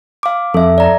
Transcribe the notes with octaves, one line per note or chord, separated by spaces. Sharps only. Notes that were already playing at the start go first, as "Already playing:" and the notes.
F5 D6
F2 A4 E5
D5 A#5